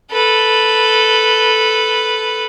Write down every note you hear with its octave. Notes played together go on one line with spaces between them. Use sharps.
A4 B4